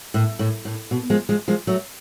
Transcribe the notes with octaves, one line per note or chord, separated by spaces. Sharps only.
A2
A2
A2
B2
F3 G#3
F3 G#3
F3 G#3
F#3 A3